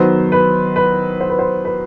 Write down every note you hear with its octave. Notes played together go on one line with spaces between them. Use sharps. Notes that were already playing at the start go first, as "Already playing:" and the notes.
Already playing: D#3 F#3 B3 C5
B4
B4
C5
B4
C5
B4